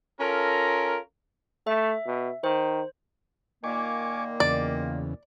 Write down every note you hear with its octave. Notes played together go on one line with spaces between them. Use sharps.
C#4 F4 A4 A#4
A3 E5
B2
D#3 C5
A#2 D#3 A#3 G#5 C#6 D6
E2 C#3 D5